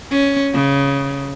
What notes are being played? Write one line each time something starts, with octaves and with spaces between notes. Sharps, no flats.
C#4
C#3